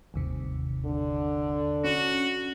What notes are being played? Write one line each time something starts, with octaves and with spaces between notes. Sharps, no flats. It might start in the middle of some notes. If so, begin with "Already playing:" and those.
G1 D#2 C3
D3
C#4 F#4